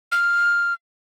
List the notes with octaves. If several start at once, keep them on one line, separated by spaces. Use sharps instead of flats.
F6